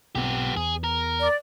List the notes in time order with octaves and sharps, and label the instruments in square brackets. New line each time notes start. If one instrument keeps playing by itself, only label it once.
[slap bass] B1 C4 [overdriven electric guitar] B3 G4
[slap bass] E2 [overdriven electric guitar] G#4
[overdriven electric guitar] A#4
[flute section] D5